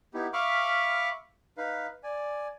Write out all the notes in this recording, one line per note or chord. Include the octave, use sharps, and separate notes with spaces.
B3 D#4 E4 G4
E5 F5 B5 C#6 D6 F6
D#4 B4 F5
D5 G#5